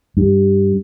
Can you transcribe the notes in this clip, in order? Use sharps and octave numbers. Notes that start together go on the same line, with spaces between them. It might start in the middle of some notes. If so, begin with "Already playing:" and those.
G2